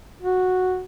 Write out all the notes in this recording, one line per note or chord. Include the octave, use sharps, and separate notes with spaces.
F#4